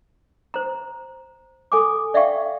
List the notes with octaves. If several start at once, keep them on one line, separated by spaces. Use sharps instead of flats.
C5 A#5
A4 G#5 D6
D5 E5 F5 G5 C#6